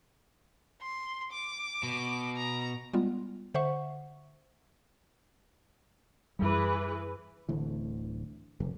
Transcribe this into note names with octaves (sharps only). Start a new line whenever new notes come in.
C6
D6
B2
A#5
G3 G#3 B3 F4
D3 C5 E5 F#5 C#6
F#2 E3 G3 G#4 B4
D1 D2 E3
F1